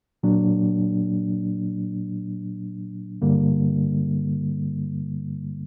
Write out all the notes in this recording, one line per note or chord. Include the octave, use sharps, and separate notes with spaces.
A#2 F#3 A#3 D4
G2 D3 G3 A#3